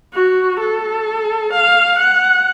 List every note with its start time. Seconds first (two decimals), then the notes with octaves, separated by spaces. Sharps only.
0.14 F#4
0.60 A4
1.53 F5
1.99 F#5